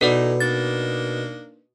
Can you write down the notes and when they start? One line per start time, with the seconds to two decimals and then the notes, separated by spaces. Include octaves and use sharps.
0.01 B2 E3 D#4 A4 B4 D5
0.40 A#3 D4 D#4 A6